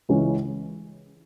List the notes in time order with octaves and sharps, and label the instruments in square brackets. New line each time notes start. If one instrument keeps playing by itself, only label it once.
[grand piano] C#2 C#3 E3 G#3 C#4